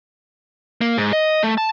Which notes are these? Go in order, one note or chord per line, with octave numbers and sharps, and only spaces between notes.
A#3
G#2
D#5
A3
A5